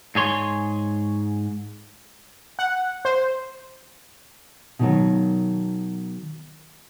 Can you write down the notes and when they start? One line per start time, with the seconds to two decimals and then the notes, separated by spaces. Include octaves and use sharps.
0.15 G#2 G#4 C#5 C6
2.59 F#5
3.05 C5
4.79 B2 D#3 F#3